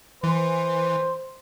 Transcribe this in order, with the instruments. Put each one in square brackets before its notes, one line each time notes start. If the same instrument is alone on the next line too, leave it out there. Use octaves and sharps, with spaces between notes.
[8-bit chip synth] E3 [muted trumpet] C5